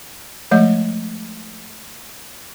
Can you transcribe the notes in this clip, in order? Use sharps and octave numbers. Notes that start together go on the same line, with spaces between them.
F3 G#3 A3 D#5